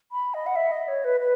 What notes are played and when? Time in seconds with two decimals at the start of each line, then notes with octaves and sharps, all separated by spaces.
0.12 B5
0.34 D#5
0.46 F#5
0.56 E5
0.71 D#5
0.88 C#5
1.04 B4
1.20 B4